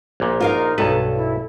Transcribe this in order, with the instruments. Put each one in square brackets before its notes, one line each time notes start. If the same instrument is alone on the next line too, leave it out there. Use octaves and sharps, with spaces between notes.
[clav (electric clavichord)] A#1 A#2
[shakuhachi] D#4 [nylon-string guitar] F4 A#4 F5
[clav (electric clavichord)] B1 G2 B4 [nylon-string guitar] A4
[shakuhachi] E4